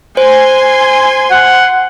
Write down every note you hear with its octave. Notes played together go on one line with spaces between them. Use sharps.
C5 G#5 C6
F#5